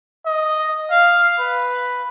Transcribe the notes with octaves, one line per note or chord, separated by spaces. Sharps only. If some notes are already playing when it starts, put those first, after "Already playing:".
D#5
F5
B4